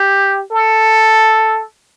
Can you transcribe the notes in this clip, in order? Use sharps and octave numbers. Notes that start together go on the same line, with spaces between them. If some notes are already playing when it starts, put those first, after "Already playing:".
Already playing: G4
A4